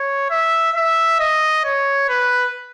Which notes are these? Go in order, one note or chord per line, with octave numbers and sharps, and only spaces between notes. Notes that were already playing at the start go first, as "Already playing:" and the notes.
Already playing: C#5
E5
E5
D#5
C#5
B4